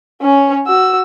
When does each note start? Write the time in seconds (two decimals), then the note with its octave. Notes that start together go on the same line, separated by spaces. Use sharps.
0.21 C#4 C#5
0.66 F#4 E6